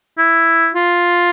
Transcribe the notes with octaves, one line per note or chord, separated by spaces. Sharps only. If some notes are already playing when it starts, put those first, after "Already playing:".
E4
F4